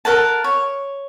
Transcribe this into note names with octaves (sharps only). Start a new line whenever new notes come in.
A4 A#4 F#5 A5
C#5